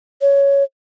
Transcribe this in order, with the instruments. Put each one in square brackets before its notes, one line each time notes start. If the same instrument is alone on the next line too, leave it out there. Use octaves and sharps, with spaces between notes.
[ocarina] C#5